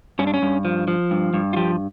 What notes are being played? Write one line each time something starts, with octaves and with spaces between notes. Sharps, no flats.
G2 C#4
D4
C#4
G2
F3
F3
G2
G2
F4
F3 G4